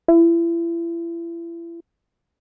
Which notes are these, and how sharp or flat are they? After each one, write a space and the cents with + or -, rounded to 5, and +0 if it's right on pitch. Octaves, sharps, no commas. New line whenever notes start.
E4 +35